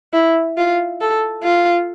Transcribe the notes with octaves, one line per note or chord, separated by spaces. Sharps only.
E4
F4
A4
F4